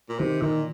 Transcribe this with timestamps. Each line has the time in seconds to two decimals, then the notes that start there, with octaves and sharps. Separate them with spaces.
0.09 A#2
0.19 C3 D#3
0.41 A#2 D#3